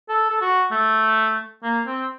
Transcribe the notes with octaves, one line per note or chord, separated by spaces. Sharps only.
A4
A4
F#4
A3
A#3
C4